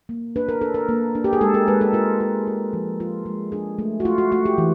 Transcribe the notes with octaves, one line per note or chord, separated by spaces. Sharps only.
A#3
D4 B4
A#4
D4 A4
A#4
A#3
D4
G4
G#4
G#3 A4
A#4
G#3 B4
A4
F4 A#4
F4
F4
F3
F4
G#3
D4 G#4
A3
F#4
A3 F4
F#4
A3 F#4
G4
E3